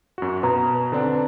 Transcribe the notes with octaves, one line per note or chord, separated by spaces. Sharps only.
F#2 F#4
B2 B4 A#5
D3 C4 D4